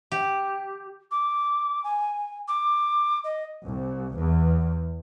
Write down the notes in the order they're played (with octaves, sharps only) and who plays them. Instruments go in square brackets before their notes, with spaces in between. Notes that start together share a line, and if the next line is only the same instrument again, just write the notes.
[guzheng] G4
[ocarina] D6
G#5
D6
D#5
[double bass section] C2
E2